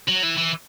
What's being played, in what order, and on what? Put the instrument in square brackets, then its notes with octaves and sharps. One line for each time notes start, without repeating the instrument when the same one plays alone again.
[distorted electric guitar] F#3
E3
E3